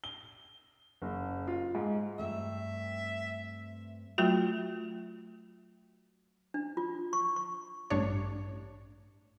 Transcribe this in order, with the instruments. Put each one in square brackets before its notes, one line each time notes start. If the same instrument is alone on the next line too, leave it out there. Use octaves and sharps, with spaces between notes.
[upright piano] G7
F#1
F4
G#2
[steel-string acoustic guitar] G2 A3 C4 [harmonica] E5
[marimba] F#3 A3 F4 F#4
[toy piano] D4
F4
C#6
C#6
[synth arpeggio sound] A1 G2 D4 C#5